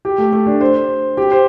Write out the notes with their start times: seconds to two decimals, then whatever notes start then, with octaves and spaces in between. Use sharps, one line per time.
0.05 G4
0.18 A3
0.33 A3
0.46 D4
0.61 C5
1.17 G4
1.31 C5